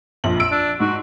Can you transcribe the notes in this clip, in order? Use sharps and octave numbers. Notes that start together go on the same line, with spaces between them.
A#1 F2 F#7
E6 D7
D4
G#2 F#4